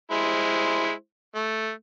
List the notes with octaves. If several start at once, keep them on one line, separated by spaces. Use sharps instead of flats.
G#3 E4 C5
A3